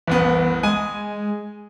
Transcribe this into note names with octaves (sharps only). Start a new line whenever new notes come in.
F#1 C2 E3 B3
G#3 G#5 D#6 D#7